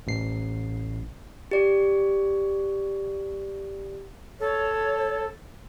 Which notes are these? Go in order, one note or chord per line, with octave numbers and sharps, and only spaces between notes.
A1 C7
G4 D5
A4 C#5